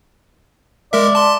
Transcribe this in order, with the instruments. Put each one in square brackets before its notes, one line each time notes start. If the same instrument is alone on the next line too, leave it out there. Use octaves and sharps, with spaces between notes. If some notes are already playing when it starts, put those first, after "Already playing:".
[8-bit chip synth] G#3 A#4 E5 [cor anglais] D5
[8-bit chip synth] A5 C6